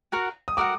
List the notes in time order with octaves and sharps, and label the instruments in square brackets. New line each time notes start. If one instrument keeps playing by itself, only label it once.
[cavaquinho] F#4 A#4 F#5
[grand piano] D#6
[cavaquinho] F#4 A#4 F#5 [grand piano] D6